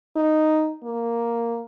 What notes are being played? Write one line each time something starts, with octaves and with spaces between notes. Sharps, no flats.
D#4
A#3